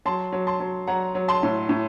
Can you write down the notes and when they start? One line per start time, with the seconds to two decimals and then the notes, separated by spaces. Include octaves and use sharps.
0.05 F#3 A5 C6
0.32 F#3
0.47 A5 C6
0.60 F#3
0.87 F#3 F#5 A#5
1.15 F#3
1.28 A5 C6
1.43 A2
1.69 A2